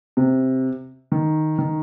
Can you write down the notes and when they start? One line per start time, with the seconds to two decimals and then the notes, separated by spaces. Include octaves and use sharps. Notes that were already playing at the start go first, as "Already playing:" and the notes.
0.17 C3
1.12 D#3
1.58 D#3